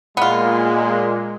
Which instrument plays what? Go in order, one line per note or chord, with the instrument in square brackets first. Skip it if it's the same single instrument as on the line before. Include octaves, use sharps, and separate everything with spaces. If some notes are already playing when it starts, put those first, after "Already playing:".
[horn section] A#2 G#3 [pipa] B3 F4